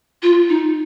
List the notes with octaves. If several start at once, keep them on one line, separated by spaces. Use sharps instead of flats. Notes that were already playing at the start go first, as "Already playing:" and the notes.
F4
D#4